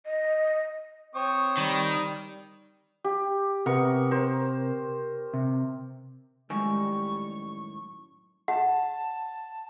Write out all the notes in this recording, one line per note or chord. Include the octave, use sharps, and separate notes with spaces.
D#5
C4 C5 C#5 C#6 D#6
D#3 G3
G4
C3 B3 A#4 C#6
A#4 C5
C3
F#2 A2 D#3 G3 G#3 C#6
F#5 A5